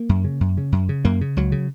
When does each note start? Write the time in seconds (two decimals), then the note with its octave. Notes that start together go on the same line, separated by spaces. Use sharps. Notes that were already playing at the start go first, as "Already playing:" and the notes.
Already playing: A#3
0.09 F#2
0.24 C#3
0.41 F#2
0.57 C#3
0.72 F#2
0.89 C#3
1.05 F#2 A#3
1.21 C#3
1.37 C#2 F#3
1.52 C#3